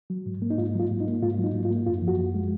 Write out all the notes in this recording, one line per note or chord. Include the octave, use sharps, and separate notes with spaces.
F#3
G#2
A#3
D#4
G#2 F4
F#3 F4
G#2
D#4
A#3
G#2 F4
F#3
D#4
G#2
F4
A#3
F#2 F4
F3
F#4
F#2
G#3